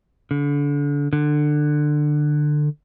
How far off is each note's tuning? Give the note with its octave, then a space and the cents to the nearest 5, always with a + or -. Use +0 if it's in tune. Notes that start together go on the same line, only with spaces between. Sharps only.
D3 -30
D3 +20